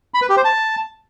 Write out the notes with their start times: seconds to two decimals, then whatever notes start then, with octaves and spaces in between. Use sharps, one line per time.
0.14 B5
0.22 B4
0.29 G4
0.37 C5
0.45 A5